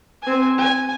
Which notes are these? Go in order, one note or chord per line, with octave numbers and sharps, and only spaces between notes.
C4 G#5
G#5